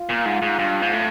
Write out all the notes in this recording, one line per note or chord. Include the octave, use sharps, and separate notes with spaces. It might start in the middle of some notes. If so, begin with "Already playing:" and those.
Already playing: F4
A#2
G#2
G#2
G2
G#2
A2